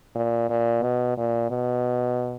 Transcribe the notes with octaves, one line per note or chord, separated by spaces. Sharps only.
A#2
A#2
B2
A#2
B2